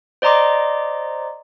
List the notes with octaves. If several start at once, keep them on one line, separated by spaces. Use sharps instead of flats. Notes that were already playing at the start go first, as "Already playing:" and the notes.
C5 D5 D#5 A#5 C6 D6